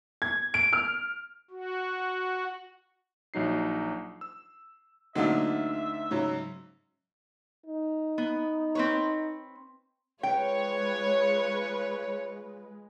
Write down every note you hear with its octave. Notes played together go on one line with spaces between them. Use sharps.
G#6
D7
F6
F#4
A#1 F#3 D#4 C7
E6
D2 A#2 D3 F#3 D#4 E5
G#2 C#3 F#3
D#4
B3
C4 B4 C#5
G#3 F4 B4 C#5 G5